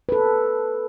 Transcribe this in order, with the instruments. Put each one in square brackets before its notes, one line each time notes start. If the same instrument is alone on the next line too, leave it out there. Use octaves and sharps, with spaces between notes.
[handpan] A4 B4